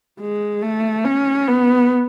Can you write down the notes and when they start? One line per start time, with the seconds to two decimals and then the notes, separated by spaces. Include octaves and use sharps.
0.20 G#3
0.62 A3
1.05 C#4
1.47 B3